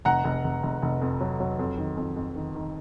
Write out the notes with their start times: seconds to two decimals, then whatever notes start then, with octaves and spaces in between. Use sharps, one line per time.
0.05 F1 F#5 A#5
0.24 F1
0.44 F1
0.63 F1
0.82 F1
1.01 F2
1.20 F#3
1.40 F#3
1.59 F2
1.78 D#3
1.97 F2
2.16 F2
2.35 D#3
2.55 D#3